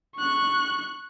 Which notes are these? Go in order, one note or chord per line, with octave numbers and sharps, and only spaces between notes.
C#6 F#6